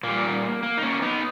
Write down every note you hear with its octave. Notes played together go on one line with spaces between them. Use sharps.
A#2 G3 A#3
A#3
D#4
A#3 C#4
B3 D#4